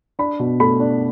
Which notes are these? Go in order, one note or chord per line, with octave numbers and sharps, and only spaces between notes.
D4 B5
B2
A3 B5
D4